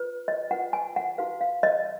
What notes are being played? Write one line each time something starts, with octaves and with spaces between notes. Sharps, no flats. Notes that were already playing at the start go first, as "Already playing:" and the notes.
Already playing: F4 B4
D#5
F4 B4 F#5
G#5
F#5
D#4 F#4 B4 F5
F5
D#5